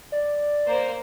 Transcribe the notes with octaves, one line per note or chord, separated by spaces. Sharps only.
D5
A#3 C5